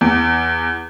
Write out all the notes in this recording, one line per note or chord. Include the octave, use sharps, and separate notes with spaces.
E2